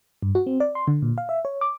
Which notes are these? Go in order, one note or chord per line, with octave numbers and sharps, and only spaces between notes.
G2
F#4
C4
D5
C6
D3
A#2
F5
E5
C#5
D6